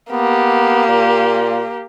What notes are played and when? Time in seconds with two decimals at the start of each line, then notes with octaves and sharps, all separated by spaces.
0.11 A#3 B3 G4
0.89 A#2